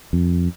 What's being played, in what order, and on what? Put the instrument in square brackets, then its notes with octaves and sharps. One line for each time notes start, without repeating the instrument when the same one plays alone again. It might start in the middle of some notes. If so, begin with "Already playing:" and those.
[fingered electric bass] F2